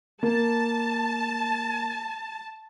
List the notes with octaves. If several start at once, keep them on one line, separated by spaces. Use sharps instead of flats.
A#3 A5